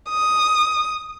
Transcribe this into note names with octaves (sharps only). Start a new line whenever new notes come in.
D#6